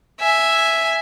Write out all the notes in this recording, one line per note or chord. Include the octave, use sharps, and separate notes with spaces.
E5 G#5